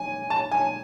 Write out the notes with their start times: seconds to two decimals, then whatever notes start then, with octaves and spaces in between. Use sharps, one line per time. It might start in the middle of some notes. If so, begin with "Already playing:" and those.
Already playing: G#5
0.30 A5
0.51 G#5